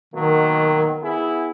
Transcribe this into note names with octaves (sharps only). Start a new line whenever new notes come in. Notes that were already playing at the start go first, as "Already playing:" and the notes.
B2 D#3 F#3 A#3
B3 E4 G#4